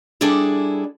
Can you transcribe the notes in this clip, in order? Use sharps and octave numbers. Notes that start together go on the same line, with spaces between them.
G3 D4 E4 G#4 A4